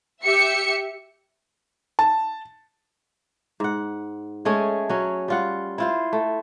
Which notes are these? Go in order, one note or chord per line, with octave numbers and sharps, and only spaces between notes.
G4 E5 C#7
A5
G#2 F#5
G#3 A3 C#4 G#4
F#3 C#4
G3 F4 F#5
E4 F4 C5
A3